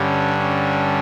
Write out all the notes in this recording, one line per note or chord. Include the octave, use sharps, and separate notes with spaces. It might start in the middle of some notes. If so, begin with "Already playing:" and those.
Already playing: G2 D3 G3 C#4
C#4